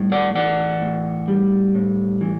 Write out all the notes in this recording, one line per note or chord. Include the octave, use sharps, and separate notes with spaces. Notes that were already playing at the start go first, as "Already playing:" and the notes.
Already playing: A2 G3
D5 F#5
E3 D5 F#5
A2
G3
A2
E3